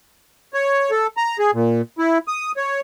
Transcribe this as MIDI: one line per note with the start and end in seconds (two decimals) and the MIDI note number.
0.54 0.91 73
0.91 1.07 69
1.17 1.37 82
1.39 1.51 68
1.54 1.81 46
1.99 2.18 64
2.28 2.52 87
2.57 2.80 73